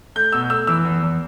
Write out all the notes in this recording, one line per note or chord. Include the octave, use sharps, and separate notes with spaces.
A3 G6
B2 E6
A3 E6
E3 E6
E2
E2